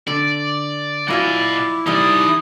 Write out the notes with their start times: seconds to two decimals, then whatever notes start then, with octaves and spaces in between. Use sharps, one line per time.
0.07 D3 D5
1.08 F#3 E4 F4 D5 D#5 F#5 G#5
1.87 E3 G3 D#4 D5 D#6